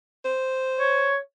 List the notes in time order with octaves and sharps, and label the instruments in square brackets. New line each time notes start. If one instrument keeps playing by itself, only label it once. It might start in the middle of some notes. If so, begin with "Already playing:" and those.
[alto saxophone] C5
[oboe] C#5